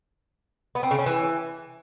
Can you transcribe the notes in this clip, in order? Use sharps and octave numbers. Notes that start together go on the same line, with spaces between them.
B3
C4
C#3
C#4
E3